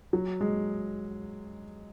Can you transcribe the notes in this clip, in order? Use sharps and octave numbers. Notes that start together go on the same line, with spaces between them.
F#3
G#3